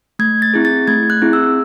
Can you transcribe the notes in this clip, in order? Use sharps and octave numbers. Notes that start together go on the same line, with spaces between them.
A3 G#6
A6
C4 E4 G#4
A6
A3 G#6
F#6
C4 E4 G#4
E6